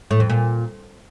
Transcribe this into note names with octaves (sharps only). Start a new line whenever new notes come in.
A2
F2
A#2